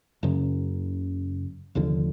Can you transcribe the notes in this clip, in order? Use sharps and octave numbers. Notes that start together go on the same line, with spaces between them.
F#1 F#2 C#3
F1 D#2 D3 F3